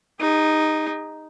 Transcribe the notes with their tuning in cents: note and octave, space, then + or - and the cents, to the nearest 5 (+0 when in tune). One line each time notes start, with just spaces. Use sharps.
D#4 +0 G#4 -45